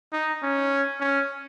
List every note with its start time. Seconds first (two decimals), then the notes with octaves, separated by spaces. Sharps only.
0.13 D#4
0.42 C#4
1.00 C#4